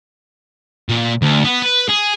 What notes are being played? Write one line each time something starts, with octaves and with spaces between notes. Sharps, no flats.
A#2
D2
B3
B4
G#4